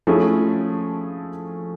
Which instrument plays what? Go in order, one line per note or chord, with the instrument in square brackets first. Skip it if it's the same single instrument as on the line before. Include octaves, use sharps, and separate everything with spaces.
[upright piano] F3 A3 C#4 E4 G#4